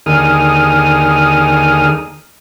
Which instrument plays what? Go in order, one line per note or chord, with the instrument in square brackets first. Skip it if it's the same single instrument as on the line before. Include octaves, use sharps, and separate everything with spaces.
[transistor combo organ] D#2 D3 D#3 G#4 D#6 F6